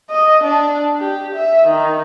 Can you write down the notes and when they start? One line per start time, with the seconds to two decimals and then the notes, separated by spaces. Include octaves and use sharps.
0.10 D#5
0.44 D4
1.00 G4
1.35 E5
1.68 D#3